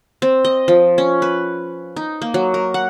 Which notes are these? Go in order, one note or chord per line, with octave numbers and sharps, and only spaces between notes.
C4
D#5
F3
C#4
B4
D#4
A#3
F#3
A#4
F#5